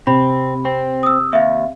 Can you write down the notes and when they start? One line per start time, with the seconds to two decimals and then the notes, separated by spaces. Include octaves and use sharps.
0.07 C3 C4 B5
0.65 C4
1.03 D#6 E6
1.33 D#2 E5 F5